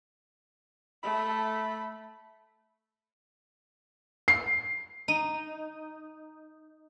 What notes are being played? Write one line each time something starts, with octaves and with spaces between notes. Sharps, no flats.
A3 B5
C7
D#4 D#7